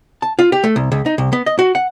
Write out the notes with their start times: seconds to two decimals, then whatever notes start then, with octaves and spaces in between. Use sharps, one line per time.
0.22 A5
0.39 F4
0.52 G4
0.64 A3
0.76 C2
0.92 C#2
1.06 D#4
1.18 C2
1.33 B3
1.46 D#5
1.59 F#4
1.75 F#5